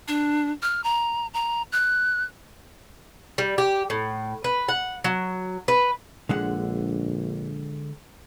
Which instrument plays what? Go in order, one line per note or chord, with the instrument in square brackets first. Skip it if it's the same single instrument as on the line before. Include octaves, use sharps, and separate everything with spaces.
[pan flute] D4
F6
A#5
A#5
F#6
[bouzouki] G3
G4
A2
B4
F#5
F#3
B4
[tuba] A#1 [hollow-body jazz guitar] D3 G#3 F#5